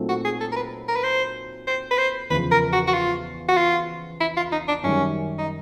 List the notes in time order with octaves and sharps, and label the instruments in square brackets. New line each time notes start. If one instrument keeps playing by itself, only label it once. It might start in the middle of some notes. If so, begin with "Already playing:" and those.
Already playing: [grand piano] A#2 F#3 A3 C4 D#4
[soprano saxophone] F#4
G#4
A4
A#4
B4
A#4
B4
C5
C5
B4
C5
[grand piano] E2 C#3 F3 [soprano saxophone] B4
[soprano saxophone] A#4
F#4
F#4
F4
F#4
F4
E4
F4
D#4
D4
[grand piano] F#2 D#3 G3 [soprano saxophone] C#4
[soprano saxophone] D#4